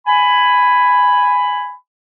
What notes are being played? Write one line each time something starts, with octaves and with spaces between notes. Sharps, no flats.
G#5 B5